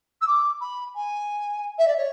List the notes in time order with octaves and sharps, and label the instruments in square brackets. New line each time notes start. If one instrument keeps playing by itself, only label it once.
[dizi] E6
D6
B5
G#5
E5
D5
C#5